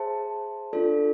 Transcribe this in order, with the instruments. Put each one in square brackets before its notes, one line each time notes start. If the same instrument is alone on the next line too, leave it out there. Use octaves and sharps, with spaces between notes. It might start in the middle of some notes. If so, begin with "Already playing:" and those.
Already playing: [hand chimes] G#4 C5 E5 A5
D4 F4 A4 D5